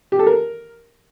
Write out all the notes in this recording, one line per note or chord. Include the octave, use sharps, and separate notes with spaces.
G4
A4
A#4